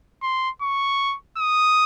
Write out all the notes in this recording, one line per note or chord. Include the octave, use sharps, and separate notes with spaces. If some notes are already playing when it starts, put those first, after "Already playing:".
C6
C#6
D#6